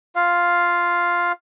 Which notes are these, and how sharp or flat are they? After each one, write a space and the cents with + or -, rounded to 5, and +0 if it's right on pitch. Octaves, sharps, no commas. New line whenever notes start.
F4 +0 F5 +0